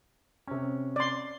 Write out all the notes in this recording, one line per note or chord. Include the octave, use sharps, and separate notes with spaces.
C3 C#4
D5 C6